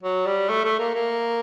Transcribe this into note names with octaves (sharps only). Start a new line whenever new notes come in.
F#3
G3
A3
A3
A#3
A#3